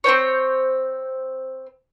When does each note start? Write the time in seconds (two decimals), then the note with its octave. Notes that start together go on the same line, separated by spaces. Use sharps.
0.04 C4 D4 C5 C#5